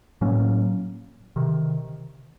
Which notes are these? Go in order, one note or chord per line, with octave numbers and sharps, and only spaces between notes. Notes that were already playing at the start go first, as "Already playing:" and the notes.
A2 F#3 A#3 C#4
C3 D#3